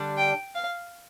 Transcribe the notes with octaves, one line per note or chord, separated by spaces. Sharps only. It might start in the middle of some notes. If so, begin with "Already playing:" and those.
Already playing: D3 G3 D4
G5
F5